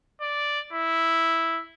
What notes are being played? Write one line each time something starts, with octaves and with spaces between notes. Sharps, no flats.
D5
E4